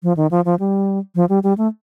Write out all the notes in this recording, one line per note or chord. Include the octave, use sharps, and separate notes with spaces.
F3
D#3
F3
F3
G3
F3
G3
G3
A3